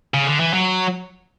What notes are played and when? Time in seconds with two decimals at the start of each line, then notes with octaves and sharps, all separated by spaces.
0.14 C#3
0.27 D3
0.40 E3
0.53 F#3